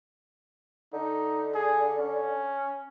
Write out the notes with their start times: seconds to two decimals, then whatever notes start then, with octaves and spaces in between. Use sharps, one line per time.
0.93 D3 D#4
1.55 G#4
1.99 C#4